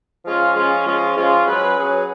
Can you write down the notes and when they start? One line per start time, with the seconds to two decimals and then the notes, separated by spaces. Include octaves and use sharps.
0.24 F3 G#3 C#4 F4
0.54 F3 G#3 C#4 F4
0.85 F3 G#3 C#4 F4
1.16 F3 G#3 C#4 F4
1.46 F#3 C#4 G#4 B4
1.76 F#3 C#4 G#4 B4